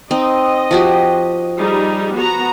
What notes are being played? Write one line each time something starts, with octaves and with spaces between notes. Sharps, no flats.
C4 D#4 D#5
F3 F#4 G4
G3 D#4 G#4
B3 F#4 A#5